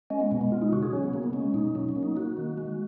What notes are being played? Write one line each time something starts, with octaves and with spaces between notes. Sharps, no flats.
G#3 C#4
B3
B2 B3
B3
G#3 F4
D#4
C#3 F#4
G#4
F#3 C#4
B3
A#3
B3
G#3 C#4
B2 D#4
F#3 C#4
C#4
A#3
D#4
A#3 F#4
D#3
G#3